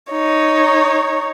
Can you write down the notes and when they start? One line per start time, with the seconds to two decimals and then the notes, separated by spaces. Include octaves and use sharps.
0.12 D#4 C#5